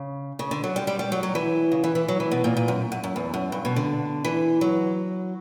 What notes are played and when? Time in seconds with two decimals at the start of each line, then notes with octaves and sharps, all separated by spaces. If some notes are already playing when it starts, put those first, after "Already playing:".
Already playing: C#3
0.39 C#3
0.51 D3
0.64 F#3
0.76 G3
0.87 G3
0.99 G3
1.12 F#3
1.23 F#3
1.35 E3
1.72 C#3
1.84 E3
1.95 E3
2.08 F#3
2.20 E3
2.31 B2
2.44 A#2
2.57 A#2
2.68 F#2
2.92 F#2
3.03 F#2
3.16 E2
3.34 F#2
3.52 G2
3.65 B2
3.76 D3
4.24 E3
4.61 F#3